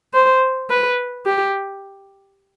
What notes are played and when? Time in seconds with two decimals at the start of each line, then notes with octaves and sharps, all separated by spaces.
0.14 C5
0.70 B4
1.26 G4